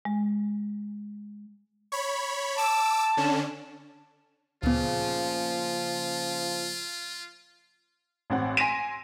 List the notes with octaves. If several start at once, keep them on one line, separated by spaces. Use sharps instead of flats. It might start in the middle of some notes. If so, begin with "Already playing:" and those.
G#3
C#5 B5
A5 D6 E6
D3 C#4 D4
D2 A#2 C#3 F3 B3 F4
A1 C4 F#5
G#5 C6 A#6 B6 D7 D#7